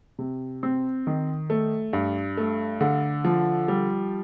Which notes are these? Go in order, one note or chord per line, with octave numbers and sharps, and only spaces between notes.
C3
C4
D#3
A3
G2
A3
D3
F3
G3